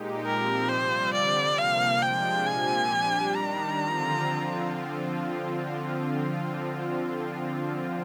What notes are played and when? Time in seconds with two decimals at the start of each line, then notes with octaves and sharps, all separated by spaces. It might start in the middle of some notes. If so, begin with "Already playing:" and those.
Already playing: A#2 G#3 D#4 G4
0.26 A#2 F3 C4 G4 A#4
0.69 C3 G3 C4 F4 C5
1.14 D3 G3 C4 D5
1.58 C3 F3 A#3 F5
2.02 C3 F3 G#3 D4 F4 G5
2.47 A#2 F3 C4 G4 G#5
2.91 G3 D4 G4
3.35 D#3 G3 D4 A#5
3.80 D3 F3 C4 F4